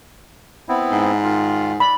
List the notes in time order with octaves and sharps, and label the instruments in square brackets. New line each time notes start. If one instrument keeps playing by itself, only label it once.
[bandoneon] B3 C4 E4
[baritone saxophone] G#2
[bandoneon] D#3 F4
[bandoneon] D5 [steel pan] B5